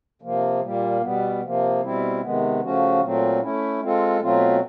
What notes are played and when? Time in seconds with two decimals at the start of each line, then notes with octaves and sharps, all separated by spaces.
0.22 C3 F3 A#3
0.61 A#2 G3 A#3
1.01 B2 G3 B3
1.41 C3 F3 A#3
1.81 B2 G3 C4 E4
2.21 C3 D#3 G#3 B3
2.61 C#3 F3 A3 C#4 F#4
3.00 A#2 F#3 A3 C4
3.41 A3 C#4 E4
3.81 G#3 C4 F4 A4
4.20 B2 F#3 A3 C4 F4